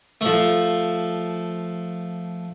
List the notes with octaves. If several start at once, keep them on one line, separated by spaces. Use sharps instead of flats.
F3 A3